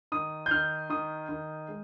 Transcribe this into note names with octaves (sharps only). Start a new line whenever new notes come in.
D#3 D#6
G6
D#3 F6
D#3 D#6
D#3
G#3